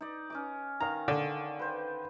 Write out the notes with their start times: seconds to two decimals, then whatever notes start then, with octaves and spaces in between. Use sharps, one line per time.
0.01 D#4 D5
0.30 C#4 D#5 D6
0.80 D#3 F5 A#5
1.08 D3
1.59 B4 C5 G5